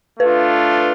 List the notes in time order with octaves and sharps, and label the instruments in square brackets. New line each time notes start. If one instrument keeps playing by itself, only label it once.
[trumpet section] A3 D4 F4 [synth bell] B4